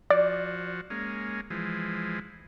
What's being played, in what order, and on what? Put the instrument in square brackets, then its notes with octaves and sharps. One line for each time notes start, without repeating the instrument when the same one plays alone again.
[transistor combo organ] F3 F#4 [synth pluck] D5
[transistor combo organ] G#3 A#3 C#4
E3 F3 G#3